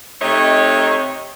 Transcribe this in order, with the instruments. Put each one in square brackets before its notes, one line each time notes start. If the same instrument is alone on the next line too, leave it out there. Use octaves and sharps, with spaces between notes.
[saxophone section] C3 A3 D#4 C#5 D#5